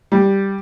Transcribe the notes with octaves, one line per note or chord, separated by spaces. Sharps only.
G3